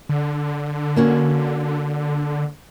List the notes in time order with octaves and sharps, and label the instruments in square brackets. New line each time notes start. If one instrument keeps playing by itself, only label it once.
[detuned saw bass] D3
[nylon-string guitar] A#3 C#4 F#4